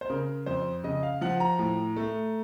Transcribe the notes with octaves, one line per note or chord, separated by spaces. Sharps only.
C5
C#3 A#4
F2 C5
C#3 D#5
F5
F3 F#5
A#5
A2
A3